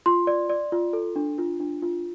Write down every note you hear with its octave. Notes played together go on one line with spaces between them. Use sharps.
F4 C6
D5
D5
F4
A4
D4
F4
D4
F4